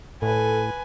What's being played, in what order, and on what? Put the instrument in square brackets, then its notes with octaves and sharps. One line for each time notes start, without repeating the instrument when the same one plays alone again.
[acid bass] A2 [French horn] A4 [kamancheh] B4 G#5